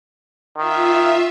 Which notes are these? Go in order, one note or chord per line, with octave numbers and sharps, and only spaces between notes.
D#3 F4 E5